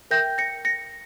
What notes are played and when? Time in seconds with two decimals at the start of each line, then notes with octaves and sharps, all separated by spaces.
0.11 A#4 E5 G5 G6 A#6
0.38 A#6 C#7
0.65 A#6 C#7